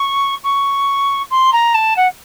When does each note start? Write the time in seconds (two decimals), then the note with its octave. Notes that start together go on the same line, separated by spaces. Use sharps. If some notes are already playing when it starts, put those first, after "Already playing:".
Already playing: C#6
0.43 C#6
1.30 C6
1.52 A#5
1.74 A5
1.96 F#5